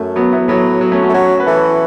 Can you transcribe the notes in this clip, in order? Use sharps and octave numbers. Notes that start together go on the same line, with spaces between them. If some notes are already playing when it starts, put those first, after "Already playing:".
Already playing: F#2 A3
F#3 B3
B3 E4
A2 F#3 B3
F#3
A3 C#4
C#4 F#4
A3
F#3 C#4 F#4
B4
E3 E4 A4